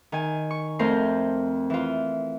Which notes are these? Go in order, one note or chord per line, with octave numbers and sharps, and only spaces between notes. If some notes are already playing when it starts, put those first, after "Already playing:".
D#3 G#5
C#6
F2 A3 A#4 C5 C6
E3 F4